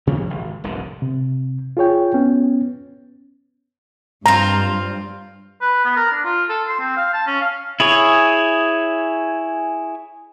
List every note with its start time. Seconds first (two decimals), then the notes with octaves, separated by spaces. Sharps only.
0.07 C3 F3 G3 A#3
0.30 G#1
0.64 F1 C2 G#2 D3
1.02 C3
1.77 F4 G#4 C#5 G5
2.14 B3 C#4
4.26 G2 C4 F4 A#5
5.61 B4
5.85 B3
5.96 A#4
6.12 D4
6.24 F4
6.49 A4
6.68 C6
6.80 C4
6.97 F5
7.13 A5
7.27 C#4
7.41 F5
7.80 E4 G#4 C#5